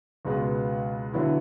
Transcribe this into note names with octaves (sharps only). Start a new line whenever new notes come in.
C#2 B2 G#3 B3
D3 F#3 B3 E4